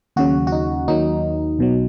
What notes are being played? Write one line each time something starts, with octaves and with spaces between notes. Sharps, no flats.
D#2 C#3 F#3 F#4
F#4
D#4
D#2 D#3 F#3 D#4
B1 B2 F#3